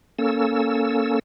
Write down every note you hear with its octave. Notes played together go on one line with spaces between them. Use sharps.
A#3 C#4 A4 E6